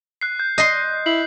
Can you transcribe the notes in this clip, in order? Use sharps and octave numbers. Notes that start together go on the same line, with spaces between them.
F#6 C7
G6
D#5 C6
E4 C7 F#7